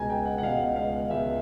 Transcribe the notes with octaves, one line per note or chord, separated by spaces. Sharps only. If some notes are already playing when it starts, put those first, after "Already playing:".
Already playing: C#2 B2 G#3 G#5 A#5
G5
F#5
F#5
C#2 B2 G#3 F5
F5
C#2 B2 G#3 E5